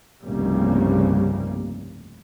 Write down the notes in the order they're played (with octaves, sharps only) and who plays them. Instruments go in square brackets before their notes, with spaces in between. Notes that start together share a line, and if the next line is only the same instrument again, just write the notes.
[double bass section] F1 C2 G2 C#3 G3 A#3